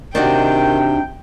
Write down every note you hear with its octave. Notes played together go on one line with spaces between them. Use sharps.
C3 D#3 D4 D#4 F#4 G5